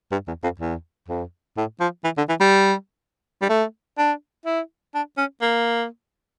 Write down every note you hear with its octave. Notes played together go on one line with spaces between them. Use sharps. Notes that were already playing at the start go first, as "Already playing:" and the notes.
G2
E2
F2
E2
F2
A2
F3
E3
D3
E3
G3
G3
A3
D4
E4
D4
C#4
A#3